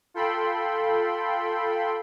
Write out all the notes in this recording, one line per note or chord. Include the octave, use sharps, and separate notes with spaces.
F4 A4 G5 B5 C6